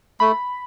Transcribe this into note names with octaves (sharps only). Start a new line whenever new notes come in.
A3 B5